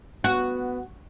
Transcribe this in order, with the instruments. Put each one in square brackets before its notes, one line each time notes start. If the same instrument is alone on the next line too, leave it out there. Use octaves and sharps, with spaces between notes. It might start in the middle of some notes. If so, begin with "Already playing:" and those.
[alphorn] B3 [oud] F#4